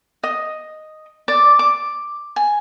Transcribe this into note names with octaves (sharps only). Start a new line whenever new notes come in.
D#5
D5
D6
G#5